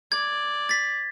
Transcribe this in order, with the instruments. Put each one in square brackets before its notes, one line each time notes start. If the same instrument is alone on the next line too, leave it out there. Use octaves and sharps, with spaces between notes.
[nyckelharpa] D5 [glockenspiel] G#6
[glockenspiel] A6 B6